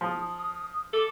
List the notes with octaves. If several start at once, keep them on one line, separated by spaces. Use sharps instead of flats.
F3 D#6
A4 D6